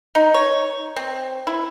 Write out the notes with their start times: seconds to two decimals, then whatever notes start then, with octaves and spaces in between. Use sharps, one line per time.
0.15 D#4
0.34 C#5
0.96 C4
1.47 E4